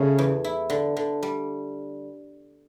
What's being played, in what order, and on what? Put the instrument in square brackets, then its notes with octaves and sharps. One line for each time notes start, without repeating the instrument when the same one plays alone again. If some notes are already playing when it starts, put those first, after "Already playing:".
Already playing: [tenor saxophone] C#3 [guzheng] G3 A3
[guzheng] E2
E4
D3
D3
G3